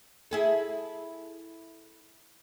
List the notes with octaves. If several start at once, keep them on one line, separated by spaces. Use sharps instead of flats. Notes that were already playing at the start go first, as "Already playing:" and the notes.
E4 G#4 A4